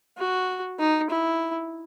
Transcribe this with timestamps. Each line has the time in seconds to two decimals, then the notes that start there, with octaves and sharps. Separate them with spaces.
0.18 F#4
0.79 D#4
1.10 E4